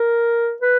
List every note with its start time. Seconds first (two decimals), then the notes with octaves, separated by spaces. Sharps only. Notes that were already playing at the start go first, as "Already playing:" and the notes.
Already playing: A#4
0.62 B4